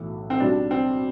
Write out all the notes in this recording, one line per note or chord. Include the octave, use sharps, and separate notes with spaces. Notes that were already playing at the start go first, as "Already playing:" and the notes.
Already playing: B1 A2 E3
C4
B1 B2 G3 D4
C4